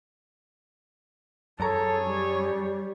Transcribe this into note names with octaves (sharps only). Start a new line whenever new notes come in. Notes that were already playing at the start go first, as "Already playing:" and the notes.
F#2 G#4 A4 C#5 A#5
G3